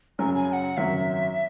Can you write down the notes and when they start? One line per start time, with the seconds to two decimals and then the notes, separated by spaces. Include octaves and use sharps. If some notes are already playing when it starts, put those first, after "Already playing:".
0.19 F#2 C#3 F#3 G#5
0.34 G#5
0.49 G#5
0.53 F#5
0.77 G#1 F#2 F#3 E5